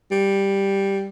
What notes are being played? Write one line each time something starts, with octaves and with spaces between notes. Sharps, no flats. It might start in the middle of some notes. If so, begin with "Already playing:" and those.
G3